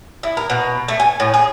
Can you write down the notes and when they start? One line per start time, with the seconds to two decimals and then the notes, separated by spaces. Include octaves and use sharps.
0.23 E4
0.37 A#4
0.50 B2
0.88 A3
1.00 G#5
1.20 A2
1.34 G#4